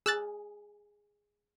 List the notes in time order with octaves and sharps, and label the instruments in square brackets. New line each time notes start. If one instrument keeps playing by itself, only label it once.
[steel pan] G#4 [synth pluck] E6 F#6 A6